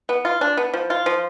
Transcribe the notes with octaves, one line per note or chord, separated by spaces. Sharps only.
B3
F4
D4
B3
F3
F4
F3